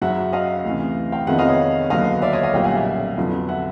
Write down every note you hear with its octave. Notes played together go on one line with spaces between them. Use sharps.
F#2 C#3 F#3 E5 F#5
D#5 F5
D2 C3 E3
F5 G5
F2 C3 D#3 G#3 B3 E5 F#5
D#5 F5
C#5 D#5
D#2 D3 F#3 B3 D#5 F5
D5 E5
C#5 D#5
D#5 F5
B1 A#2 G3 A#3 C#4 F5 G5
F#5 G#5
E5 F#5
F2 D3 F#3 B3
E5 F#5